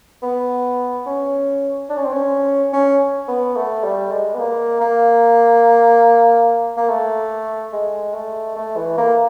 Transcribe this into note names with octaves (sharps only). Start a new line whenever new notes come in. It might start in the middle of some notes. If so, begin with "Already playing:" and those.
B3
C#4
D4
C#4
C4
C#4
C#4
B3
A3
G3
G#3
B3
A#3
A#3
A#3
A3
G#3
A3
A3
E3
A#3